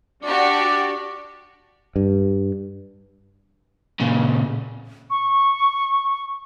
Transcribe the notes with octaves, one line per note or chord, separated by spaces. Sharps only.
D4 F#4 G4 D5
G2
A#2 C#3
C#6